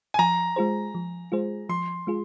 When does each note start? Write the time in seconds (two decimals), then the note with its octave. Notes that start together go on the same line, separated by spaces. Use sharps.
0.14 G#5
0.19 F3 A#5
0.56 G#3 F4 G#4 C5
0.95 F3
1.32 G#3 F4 G#4 C5
1.69 F3 C6
2.07 G#3 F4 G#4